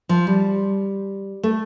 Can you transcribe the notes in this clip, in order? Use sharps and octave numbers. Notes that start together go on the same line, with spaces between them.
F3
G3
A3